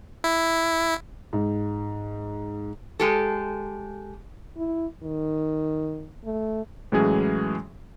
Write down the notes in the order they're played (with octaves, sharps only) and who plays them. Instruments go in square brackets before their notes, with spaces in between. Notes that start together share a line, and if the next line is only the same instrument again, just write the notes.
[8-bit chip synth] E4
[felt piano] G#2
[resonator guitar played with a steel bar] G#3 G4 A4
[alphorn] E4
D#3
A3
[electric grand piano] A2 E3 F#3 G#3 C#4 G#4